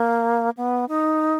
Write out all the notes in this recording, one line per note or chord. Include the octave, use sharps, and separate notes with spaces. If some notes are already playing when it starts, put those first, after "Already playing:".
Already playing: A#3
B3
D#4